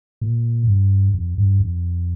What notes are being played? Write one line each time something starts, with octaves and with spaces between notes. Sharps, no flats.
A#2
G2
F2
G2
F2